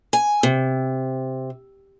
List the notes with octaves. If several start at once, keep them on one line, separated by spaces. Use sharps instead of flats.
G#5
C3